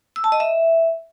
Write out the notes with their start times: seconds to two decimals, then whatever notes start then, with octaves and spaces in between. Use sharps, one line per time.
0.16 E6
0.24 A5
0.32 D#5
0.40 E5